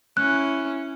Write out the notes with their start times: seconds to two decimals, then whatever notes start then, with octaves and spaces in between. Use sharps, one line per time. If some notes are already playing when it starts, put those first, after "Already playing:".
0.17 C#4 E4 F#6